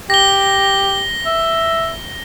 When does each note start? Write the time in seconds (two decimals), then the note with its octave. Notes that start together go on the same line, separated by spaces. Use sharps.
0.10 G4 A#6 G7
1.26 E5